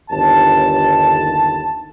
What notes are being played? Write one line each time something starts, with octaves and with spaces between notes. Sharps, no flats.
G1 D#2 A5